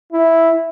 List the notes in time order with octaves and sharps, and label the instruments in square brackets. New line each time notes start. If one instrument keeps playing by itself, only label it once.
[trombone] E4